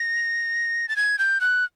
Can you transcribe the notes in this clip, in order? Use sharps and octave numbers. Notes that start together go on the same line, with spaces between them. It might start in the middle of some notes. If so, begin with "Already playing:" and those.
Already playing: A#6
A6
G#6
G6
F#6